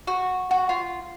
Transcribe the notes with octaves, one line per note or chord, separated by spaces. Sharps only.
F#4
F#4
F4